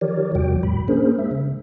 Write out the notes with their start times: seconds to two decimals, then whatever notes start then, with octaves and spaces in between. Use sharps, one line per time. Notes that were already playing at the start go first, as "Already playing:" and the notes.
0.01 D#3 F3 G4 A#4 C#5 D5
0.35 E2 C3 F3 G3 F#4 G5
0.63 A2 B5
0.88 A#3 C#4 D4 G#4 A#4 C5
1.18 G#3 E5
1.31 C#3